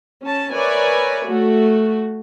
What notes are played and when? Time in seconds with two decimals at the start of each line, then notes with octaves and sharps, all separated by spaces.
0.24 C#4 A5
0.53 A#4 B4 C#5 D5 E5 G#5
1.25 A3 F#4